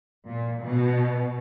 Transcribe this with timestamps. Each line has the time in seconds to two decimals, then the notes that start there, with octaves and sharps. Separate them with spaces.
0.25 A#2
0.62 B2